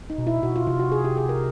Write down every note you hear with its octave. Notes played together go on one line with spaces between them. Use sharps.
D#4
B2
E4
B2 F#4
F4
C3 F4
F#4
G#4
G4
G#4
A#4